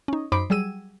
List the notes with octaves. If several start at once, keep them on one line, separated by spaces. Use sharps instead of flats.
C#4 D#4
F#2 D#4 C5 B5 D6 D7
F#3 G3 G#4 E6 D#7